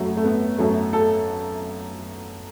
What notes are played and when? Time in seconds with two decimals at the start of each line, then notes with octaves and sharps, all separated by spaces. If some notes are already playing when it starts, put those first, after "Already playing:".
Already playing: F#2 F#3 A3
0.17 A3
0.24 B3
0.58 F#2 F#3 A3
0.93 A4